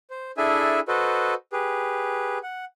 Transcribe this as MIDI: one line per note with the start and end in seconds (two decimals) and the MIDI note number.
0.10 0.31 72
0.37 0.80 62
0.37 0.80 64
0.37 0.80 68
0.37 0.80 69
0.37 0.80 76
0.37 0.80 80
0.88 1.34 66
0.88 1.34 69
0.88 1.34 71
0.88 1.34 72
0.88 1.34 75
1.53 2.39 67
1.53 2.39 68
1.53 2.39 71
2.43 2.65 78